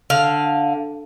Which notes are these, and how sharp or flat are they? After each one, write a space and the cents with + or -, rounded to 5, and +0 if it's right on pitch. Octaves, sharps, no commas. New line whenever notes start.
D3 +0 F5 +0